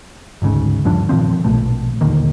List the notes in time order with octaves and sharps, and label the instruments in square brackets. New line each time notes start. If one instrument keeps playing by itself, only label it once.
[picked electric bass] G#1 D2 G#2 C#3
D#1 G2 F3 D4
A#2 D#3 F3 C4
A#1 B2 A3
D#1 D3 D#3 A#3